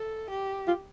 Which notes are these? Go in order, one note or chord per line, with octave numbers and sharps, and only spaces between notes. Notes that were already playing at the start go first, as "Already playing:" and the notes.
Already playing: A4
G4
F4